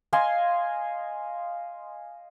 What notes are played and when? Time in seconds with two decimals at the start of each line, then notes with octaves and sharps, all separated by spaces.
0.13 D#5 F5 G#5 C6